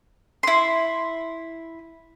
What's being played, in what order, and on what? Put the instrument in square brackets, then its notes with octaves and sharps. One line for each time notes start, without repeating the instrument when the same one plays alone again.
[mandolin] E4 C6